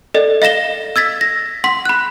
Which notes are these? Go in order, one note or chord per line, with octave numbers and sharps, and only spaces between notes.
A4 D5 D#5
D#5 F5 A#6 E7 G7
E6 G#6 A6 B6
A#6
F#5 C6 B6
B5 F#6